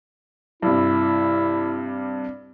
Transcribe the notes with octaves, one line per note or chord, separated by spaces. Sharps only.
G2 C3 E4